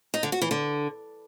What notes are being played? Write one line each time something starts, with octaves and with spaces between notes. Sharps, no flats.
D#4
D3
F#4
E3
D3